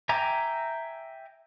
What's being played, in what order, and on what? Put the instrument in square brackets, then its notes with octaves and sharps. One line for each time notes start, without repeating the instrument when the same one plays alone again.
[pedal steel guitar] E5 G5 G#5 A#5 D6